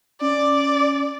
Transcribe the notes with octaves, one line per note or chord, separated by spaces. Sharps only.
C#4 D5